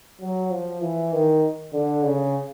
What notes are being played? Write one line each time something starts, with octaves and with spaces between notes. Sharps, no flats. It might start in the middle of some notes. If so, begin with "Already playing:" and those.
F#3
F3
E3
D#3
D3
C#3